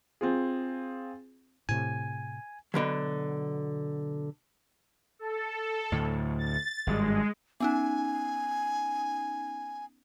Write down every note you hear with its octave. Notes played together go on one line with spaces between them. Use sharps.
C4 F4 G#4
A2 C3 G#5
B2 D3 F3 F#3
A4
D2 A2
A6
G#1 G2 G3 G#3
B3 C#4 D#4 G#5